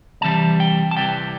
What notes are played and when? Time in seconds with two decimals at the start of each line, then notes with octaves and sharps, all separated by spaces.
0.21 C2 C3 E3 G3 A5
0.60 G5
0.91 A5
0.97 C2 C3 E3 G3 G5